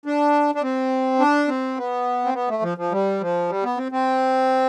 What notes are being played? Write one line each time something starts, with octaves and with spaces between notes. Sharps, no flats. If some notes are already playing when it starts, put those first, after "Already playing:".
D4
D4
C4
D4
C4
B3
C4
B3
A3
F3
F3
G3
F3
G3
B3
C4
C4